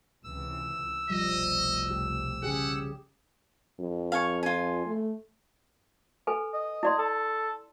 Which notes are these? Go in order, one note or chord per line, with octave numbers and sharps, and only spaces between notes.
C#2 C3 E3 E6
F1 C2 B2 F3 G3 D#5
G4
C#3 G4 G#4 F#5
F2
F5 G#5 C#6
F4 G#5
A3
A4 B4 G#5
D#5
E4 D5 C6
A4